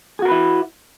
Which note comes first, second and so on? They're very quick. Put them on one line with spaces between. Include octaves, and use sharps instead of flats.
G#4 F#4 A#4 B4 E4